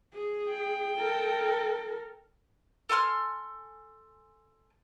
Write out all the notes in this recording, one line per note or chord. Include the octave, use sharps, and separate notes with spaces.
G#4
G5
A4 A#4
A4 G#5 C6 F6